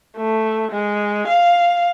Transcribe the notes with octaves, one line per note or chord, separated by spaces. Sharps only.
A3
G#3
F5